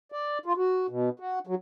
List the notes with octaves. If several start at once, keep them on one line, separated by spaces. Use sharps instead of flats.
D5
F4
F#4
B2
F#4
F#3